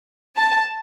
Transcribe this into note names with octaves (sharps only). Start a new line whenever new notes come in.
A5